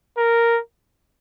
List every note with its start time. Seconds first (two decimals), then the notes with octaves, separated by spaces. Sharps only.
0.18 A#4